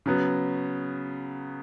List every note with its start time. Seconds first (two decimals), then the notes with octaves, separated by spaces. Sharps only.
0.06 C#3 F#3 B3